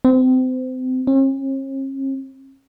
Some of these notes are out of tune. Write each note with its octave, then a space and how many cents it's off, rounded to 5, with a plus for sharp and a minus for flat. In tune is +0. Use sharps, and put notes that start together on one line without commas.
C4 -30
C#4 -45